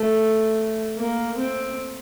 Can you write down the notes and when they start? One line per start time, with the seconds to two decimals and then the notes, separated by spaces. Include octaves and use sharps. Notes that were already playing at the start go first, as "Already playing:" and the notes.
Already playing: A3
0.97 A#3
1.37 C4